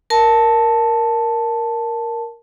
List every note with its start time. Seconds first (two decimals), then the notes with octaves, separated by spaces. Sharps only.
0.10 A#4 A5